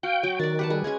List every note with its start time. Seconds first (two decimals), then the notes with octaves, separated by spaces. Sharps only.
0.03 F#4 F5 G5
0.23 F#3 F#4
0.39 D#3 F#4 D5 A6
0.59 G4 B4 F#5 A5
0.70 G3 G#4
0.84 G#3 C#4 G#4 G#6